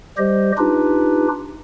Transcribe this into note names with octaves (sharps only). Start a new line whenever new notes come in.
G3 G4 C5 D#5
D4 D#4 F4 G4 B4